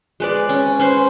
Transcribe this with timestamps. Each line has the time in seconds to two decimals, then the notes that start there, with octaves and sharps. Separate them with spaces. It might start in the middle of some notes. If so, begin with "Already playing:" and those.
0.20 G#3 B4 D5
0.49 C#4
0.80 C#4 B4 C5